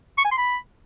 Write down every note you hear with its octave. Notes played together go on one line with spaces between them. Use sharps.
C#6
G#5
C6
B5